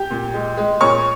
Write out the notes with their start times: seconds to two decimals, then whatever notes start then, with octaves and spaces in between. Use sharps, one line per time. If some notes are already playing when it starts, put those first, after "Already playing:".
Already playing: G4 G5
0.11 A#2
0.34 G#3
0.57 G#3
0.81 A#2 C#5 C#6